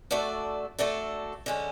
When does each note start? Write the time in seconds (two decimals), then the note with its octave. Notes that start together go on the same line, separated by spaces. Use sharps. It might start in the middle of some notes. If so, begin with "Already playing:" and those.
0.11 A3 D4 F#4 A4 D5
0.79 A3 D4 F#4 A4 D5
1.46 D3 G#3 C#4